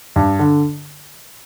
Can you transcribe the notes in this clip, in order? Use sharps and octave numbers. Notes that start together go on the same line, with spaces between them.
G2
D3